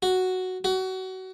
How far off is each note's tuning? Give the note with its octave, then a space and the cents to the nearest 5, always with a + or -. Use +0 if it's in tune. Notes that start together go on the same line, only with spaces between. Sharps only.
F#4 +0
F#4 +25